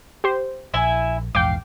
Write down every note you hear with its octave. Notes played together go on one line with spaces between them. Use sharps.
G4 C5
A#1 E4 E5 G#5
A#1 E2 G#2 F5 G5 D6